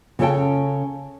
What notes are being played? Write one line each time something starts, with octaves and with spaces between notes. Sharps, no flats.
C#3 C#4 A4 C#5 G5 A5